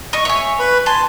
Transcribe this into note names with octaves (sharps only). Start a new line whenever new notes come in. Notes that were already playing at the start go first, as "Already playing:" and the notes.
D#5 C#6
C#5 E5 G#5
B4 B5
G#5 A5 C6